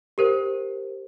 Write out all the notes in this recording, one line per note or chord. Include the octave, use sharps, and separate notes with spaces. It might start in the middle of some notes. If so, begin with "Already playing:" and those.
G4 A#4 C5